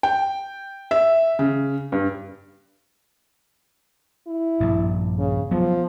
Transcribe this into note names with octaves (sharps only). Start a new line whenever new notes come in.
G5
E5
C#3
G2
E4
A#1 G2
C#3
F3 F#3 B3